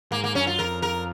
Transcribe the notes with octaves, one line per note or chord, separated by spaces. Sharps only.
G#2 A#3
A#3
F#2 C#4
F4
F2 A#4
A#4